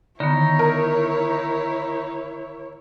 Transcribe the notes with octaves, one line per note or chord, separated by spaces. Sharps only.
D3 D#3 B3 D#4 E4 C#5
A#4